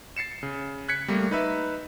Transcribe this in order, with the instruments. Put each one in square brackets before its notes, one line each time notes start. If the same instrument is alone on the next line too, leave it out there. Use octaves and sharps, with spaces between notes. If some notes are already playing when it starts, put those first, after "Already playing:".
[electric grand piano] A6 C7 C#7 E7
C#3
F#6 G#6 B6 C#7
G3 A3 A#3
D#4 B4 E5